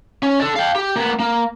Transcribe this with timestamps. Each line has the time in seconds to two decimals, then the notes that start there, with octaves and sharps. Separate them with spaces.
0.23 C#4
0.40 A4 D5
0.56 F5 G5
0.76 G4
0.96 A#3 B3
1.20 A#3